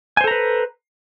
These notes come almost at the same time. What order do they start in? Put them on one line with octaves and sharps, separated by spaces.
G#5 C5 A4 A#5 B4